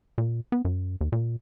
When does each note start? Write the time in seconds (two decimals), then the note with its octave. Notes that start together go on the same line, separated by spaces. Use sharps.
0.18 A#2
0.52 B3
0.65 F#2
1.01 D#2
1.12 A#2